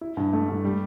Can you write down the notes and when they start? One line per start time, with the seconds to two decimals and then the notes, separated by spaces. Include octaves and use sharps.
0.01 E4
0.17 G2
0.33 A3
0.49 G2
0.64 G3